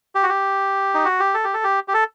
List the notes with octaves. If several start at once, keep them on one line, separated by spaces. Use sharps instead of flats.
G4
F#4
G4
D#4
F#4
G4
A4
G4
A4
G4
G4
A4